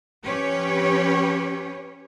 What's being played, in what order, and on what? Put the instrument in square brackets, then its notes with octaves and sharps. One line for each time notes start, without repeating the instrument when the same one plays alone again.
[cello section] F3 C#4 G4 B4 C#5